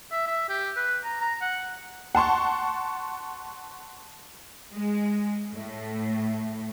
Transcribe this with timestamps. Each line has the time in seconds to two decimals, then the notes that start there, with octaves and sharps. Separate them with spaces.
0.12 E5
0.27 E5
0.49 G4
0.76 B4
1.05 A#5
1.21 A#5
1.41 F#5
2.15 F#5 A5 C6 C#6
4.73 G#3
5.53 A2